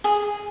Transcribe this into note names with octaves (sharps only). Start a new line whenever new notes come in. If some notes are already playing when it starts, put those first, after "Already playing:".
G#4